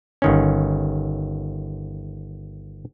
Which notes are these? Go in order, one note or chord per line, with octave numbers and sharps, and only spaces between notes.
G1 D#3 C#4